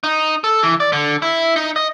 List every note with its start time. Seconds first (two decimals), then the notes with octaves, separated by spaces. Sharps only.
0.04 D#4
0.44 A4
0.63 E3
0.80 D5
0.93 D3
1.22 E4
1.56 D#4
1.76 D#5